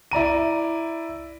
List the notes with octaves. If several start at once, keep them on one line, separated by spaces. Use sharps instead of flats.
E4 D5 A#5 D#7